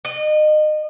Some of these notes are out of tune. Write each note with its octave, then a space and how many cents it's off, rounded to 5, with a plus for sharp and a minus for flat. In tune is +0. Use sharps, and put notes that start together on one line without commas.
D#5 -30